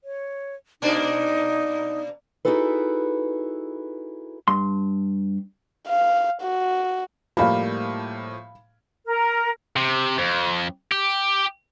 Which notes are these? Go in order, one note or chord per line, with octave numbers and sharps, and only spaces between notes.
C#5
B2 A#3 D4 D#4
D#4 E4 F#4 G#4 A4 B4
G2 C6
F5
F#4
A2 F3 G3 A#3 F5 B5
A#4
C3
F2
G4